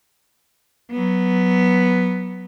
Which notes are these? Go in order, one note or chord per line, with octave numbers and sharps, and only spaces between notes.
F#3 B3